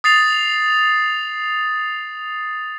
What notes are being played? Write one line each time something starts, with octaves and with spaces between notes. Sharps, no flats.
D#6 A6 C7 F7